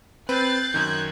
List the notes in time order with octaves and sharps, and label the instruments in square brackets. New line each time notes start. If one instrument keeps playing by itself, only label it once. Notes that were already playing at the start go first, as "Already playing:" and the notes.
[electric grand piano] C4 B4 [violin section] F#6 A6 C7 [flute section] G6
[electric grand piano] F#2 D#3 [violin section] F#6 G#6